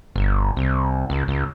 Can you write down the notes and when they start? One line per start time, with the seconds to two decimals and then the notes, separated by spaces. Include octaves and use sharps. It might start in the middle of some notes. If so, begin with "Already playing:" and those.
0.16 G1
0.57 C2
1.10 C#2
1.28 C#2